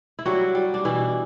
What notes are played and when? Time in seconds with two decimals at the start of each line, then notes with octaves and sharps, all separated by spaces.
0.19 E4
0.25 F#3 G3 F#4
0.55 G3
0.74 D4
0.85 B2 E3 E4